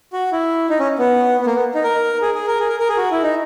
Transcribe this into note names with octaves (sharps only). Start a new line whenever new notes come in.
F#4
E4
D#4
C#4
B3
B3
A#3
B3
D#4
A#4
G#4
G#4
A#4
G#4
A#4
A#4
G#4
F#4
E4
D#4